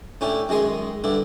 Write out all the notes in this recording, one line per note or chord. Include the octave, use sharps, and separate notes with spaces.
A2 C#4 D4 E4 G4
F#2 D#3 G#3 G#4 D#5 C6
G2 D3 D4 E4